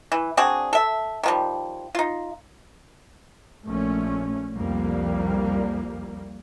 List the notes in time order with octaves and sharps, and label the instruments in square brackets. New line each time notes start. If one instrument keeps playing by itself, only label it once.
[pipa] E3
C4 D4 F#4 G#4
A4 E5
D#3 F3 G3
D#4 F4
[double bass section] A#1 A3 C#4
C2 F2 G3 A#3